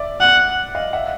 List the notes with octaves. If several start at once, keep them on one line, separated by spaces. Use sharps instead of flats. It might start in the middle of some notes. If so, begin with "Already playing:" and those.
Already playing: D5 E5
F#5
D#5 F5
E5 F#5